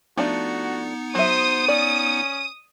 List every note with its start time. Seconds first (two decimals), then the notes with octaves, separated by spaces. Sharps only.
0.17 F3 A3 B3 D4 D#4 F#4 C#7
1.15 F#3 C5 E5 D#6
1.68 C#4 D5